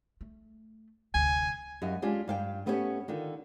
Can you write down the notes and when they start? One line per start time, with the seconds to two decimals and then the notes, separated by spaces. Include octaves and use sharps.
0.21 A3
1.14 F1 D2 G#5
1.82 F#2 G3 D#5 F5
2.02 G#3 C#4 D4 F4 G4 G#4
2.28 G2 F5 G5
2.66 A3 B3 C#4 G4 C#5
3.08 D3 D#3 F4